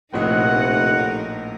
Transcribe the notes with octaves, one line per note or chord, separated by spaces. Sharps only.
F1 A#1 A2 D#4 A#4 D#5 F#5